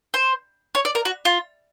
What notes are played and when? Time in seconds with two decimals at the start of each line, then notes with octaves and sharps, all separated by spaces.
0.14 C5
0.75 C#5
0.85 D5
0.95 A#4
1.05 F#4
1.25 F4